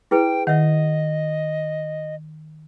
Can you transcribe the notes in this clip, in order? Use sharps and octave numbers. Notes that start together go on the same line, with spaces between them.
E4 G#4 B4 G5
D#3 D#5 E5 F#5